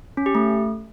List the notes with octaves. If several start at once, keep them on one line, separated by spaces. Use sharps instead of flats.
C#4
G4
A3